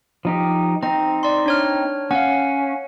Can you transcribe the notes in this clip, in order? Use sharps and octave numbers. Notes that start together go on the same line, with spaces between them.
F3 D#4 G4
C4 D#4 A#5
D5 C6
D4 C#5 F6
C#4 F5 F#5